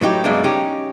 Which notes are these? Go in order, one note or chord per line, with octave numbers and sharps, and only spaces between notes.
A2 F#3 D#4 G4
F#2 B2 G#3 A#3 D4
C#4 D#4 G4